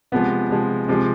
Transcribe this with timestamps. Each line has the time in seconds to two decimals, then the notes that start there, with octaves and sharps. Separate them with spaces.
0.12 C3 F3 G#3 B3
0.50 C3 F3 G#3
0.88 C3 F3 G#3